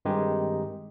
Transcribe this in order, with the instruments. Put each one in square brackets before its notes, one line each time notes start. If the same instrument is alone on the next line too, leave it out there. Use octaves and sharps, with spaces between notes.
[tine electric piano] G2 D#3 G#3 C4 D#4 G4